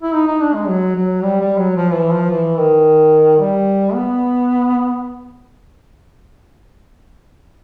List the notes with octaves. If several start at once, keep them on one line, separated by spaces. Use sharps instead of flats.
E4
D#4
D#4
D4
G#3
F#3
F#3
G3
G3
F#3
F3
E3
F3
E3
D#3
G3
B3